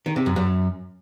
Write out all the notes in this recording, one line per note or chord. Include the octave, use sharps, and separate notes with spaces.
D#3
C3
F#2
F#2